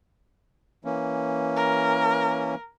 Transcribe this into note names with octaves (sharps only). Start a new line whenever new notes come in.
E3 A#3 C#4
A#4